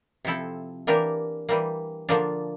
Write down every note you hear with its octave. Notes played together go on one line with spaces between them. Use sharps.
C3 F3 C4 E4 A4
E3 A#3 D4 G4 A#4
E3 G3 A#3
D3 F3 A#3 D4